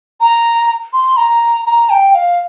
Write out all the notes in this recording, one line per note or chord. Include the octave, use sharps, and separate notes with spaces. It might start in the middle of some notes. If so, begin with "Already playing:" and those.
A#5
C6
A#5
A#5
G5
F5